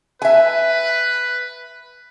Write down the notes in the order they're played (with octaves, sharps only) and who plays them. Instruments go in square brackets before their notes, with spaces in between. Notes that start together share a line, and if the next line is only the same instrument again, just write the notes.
[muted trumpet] B4 [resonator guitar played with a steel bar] E5 G#5